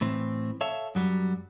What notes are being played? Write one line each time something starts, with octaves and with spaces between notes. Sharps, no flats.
A2 E3 C4
A4 C#5 E5 F5
F#2 F#3 G3